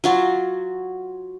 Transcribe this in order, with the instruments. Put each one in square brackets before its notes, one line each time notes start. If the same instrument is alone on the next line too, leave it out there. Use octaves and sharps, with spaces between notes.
[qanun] F#3 F4 F#4